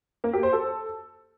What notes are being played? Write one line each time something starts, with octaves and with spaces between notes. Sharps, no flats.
A#3
G4
C5
A4